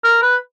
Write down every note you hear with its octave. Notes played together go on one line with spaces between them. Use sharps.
A#4
B4